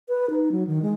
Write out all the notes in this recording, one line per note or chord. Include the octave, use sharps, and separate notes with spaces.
B4
D#4
F#3
D#3
G#3